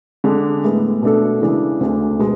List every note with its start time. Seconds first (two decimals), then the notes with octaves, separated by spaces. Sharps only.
0.24 D3 G#3 D4
0.64 A2 G#3 B3
1.02 B2 A3 D4 A4
1.41 C#3 E3 G#3 D4
1.81 D2 D3 A3 D4
2.19 B2 G#3